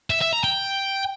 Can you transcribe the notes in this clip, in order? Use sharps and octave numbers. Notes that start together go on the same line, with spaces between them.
E5
E5
A#5
G5